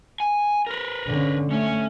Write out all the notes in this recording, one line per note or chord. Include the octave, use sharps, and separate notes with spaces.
G#5
A#4 B4
D3 C#4
A3 C#4 C#5